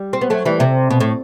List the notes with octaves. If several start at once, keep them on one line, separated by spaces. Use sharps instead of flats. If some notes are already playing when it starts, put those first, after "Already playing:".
Already playing: G3
C4
B3
F#3 A3
E3 G3
C3
B2
A2